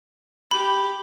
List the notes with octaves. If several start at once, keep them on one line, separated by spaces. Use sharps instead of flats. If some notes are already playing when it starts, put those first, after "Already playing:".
G4 B5